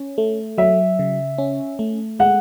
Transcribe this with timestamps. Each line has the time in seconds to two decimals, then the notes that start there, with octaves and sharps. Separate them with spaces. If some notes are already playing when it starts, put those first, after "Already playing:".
Already playing: C#4
0.18 A3
0.58 F#3 E5
0.99 C#3
1.38 C#4
1.79 A3
2.19 G#3 F#5